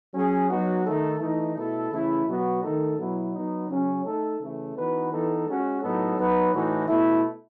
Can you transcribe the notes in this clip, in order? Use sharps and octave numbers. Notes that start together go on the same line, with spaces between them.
F#3 C#4 G#4
F#3 B3 D#4 F#4
D#3 A3 D#4 A4
E3 A3 D#4
B2 A3 E4 A4
C#3 E3 A3 E4
B2 F#3 B3 F#4
D#3 A3 D#4 A4
B2 F#3 B3 E4
F#3 B3 D#4
C#3 F#3 C#4
A3 D#4 A4
C#3 E3 A3
E3 B3 D#4 F#4 B4
E3 B3 D#4 A4
G#3 C#4 F#4
A2 F#3 B3 D#4 A4
F#3 B3 D#4 F#4 B4
A2 E3 A3 D#4 F#4
B2 A3 E4